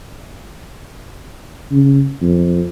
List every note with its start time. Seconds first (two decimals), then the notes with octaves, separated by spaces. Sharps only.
1.71 C#3
2.22 F2